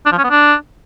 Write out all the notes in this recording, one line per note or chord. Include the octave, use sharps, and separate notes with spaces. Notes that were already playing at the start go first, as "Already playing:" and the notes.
D4
F3
C#4
B3
D4